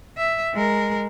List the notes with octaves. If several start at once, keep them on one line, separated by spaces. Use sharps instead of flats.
E5
G#3 A#4